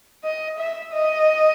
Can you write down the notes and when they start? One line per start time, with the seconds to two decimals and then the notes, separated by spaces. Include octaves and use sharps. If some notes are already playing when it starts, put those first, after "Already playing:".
0.24 D#5
0.59 E5
0.93 D#5